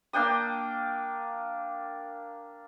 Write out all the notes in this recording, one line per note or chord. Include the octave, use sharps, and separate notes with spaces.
A#3 D4 G5 D#6